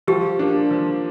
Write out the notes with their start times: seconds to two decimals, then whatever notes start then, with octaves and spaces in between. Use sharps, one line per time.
0.08 F3 G4
0.39 A#3 D4
0.71 F3